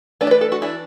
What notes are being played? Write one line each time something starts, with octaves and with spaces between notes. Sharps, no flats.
E3 A3 D4 B4
D5
B4
A4
F#4
E3 D4 E4